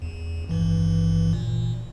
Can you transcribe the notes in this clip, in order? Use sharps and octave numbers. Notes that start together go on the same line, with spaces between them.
E2
G#1 G2 E3
A#2